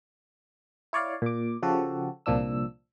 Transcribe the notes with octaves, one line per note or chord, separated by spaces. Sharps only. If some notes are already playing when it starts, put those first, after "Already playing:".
E4 C#5 D5 F5
A#2 D6
C#3 F3 F#4 G4 A4
C2 A#2 F3 D4 E6